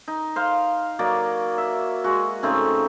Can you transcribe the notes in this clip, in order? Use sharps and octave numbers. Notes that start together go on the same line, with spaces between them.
D#4
C5 F5
F#3 A#3 D#4 D5
E5
G#3 F#4
C#3 A3 C4 D#4